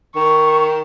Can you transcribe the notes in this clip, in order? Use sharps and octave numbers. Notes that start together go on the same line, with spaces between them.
D#3 C#6